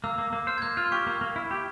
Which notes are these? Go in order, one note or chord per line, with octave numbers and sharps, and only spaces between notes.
A#3 E6
A#3
A#3
C5 F6
G#6
A#3 G6
F4 F6
G4 C#6
A#3
A#3
E4
G4